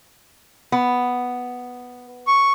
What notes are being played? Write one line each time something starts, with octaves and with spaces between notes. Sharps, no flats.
B3
C#6